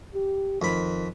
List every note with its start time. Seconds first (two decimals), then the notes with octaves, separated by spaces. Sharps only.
0.14 G4
0.62 F2 D#3 B5